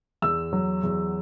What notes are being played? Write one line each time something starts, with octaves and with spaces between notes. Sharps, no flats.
E2 E6
F#3
E2